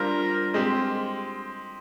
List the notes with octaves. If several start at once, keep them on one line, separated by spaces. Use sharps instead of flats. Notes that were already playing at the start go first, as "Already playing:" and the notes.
Already playing: G3 D4 F4 A#4 C5
G#3 C4 G4